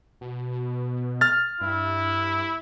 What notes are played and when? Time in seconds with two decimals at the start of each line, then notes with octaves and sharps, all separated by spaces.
0.21 B2
1.21 F6 A6
1.61 G2 E4